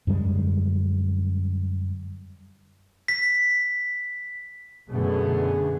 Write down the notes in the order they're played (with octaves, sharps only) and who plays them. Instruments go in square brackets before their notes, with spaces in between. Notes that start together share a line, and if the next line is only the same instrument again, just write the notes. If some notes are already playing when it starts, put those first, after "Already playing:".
[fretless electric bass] F#2 D3 G3 G#3
[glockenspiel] B6
[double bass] F#2 A3 [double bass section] B2 D3 [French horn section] B3 G#4